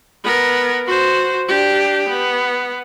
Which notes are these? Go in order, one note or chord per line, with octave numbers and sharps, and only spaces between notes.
B3 A#4
F#4 C5
D4 G4
B3